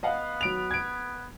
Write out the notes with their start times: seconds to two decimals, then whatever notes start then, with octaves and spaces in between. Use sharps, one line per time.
0.03 B3 D#5 F5 F#5
0.41 F#3 D7 F7
0.71 G#6 D7